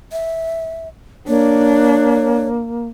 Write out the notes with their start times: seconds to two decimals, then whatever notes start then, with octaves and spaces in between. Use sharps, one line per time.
0.12 E5
1.28 A#3 D4 C#5